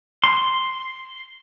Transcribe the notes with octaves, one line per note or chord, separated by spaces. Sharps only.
C6